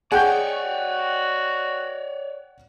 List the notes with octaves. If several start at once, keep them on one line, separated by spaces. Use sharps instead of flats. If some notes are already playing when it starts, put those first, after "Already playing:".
G#4 C#5 D5 F#5 G5 C#6 G6
F#4